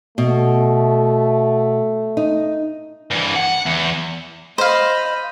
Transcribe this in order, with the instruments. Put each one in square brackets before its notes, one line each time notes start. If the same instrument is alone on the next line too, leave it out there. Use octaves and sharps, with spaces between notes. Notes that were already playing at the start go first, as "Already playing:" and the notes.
[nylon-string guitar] B2 [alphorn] A3
[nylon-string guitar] D#4
[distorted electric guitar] G2 E3
F#5
E2
[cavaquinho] C5 F5 [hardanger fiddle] D#5 B5